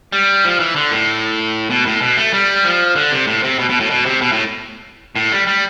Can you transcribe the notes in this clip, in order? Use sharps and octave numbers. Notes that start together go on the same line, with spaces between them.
G3
F3
E3
D3
A2
B2
A2
B2
A3
G3
F3
D3
C3
A2
C3
B2
B2
A2
B2
C3
B2
A2
A2
G3
G3